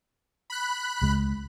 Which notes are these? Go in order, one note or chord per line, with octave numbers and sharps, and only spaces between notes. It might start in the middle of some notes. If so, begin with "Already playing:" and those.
B5 F#6
C#2 C#3 G#3